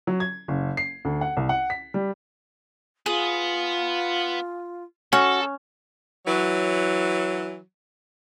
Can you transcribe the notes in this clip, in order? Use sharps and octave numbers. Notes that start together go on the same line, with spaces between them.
F#3
G#6
F#1
C7
D2
F#5
C2
F#5
B6
G3
B3 F4 G#4
C#4 F#4 A4
E3 F#3